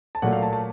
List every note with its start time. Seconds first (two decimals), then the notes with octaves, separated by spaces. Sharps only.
0.15 A5
0.22 A#2 F#3 A3 F#5
0.33 F5
0.42 A5
0.53 A5